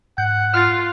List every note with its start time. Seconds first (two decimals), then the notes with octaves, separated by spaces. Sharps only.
0.18 G#2 F#5 G6
0.54 F4 F6 F#6 A6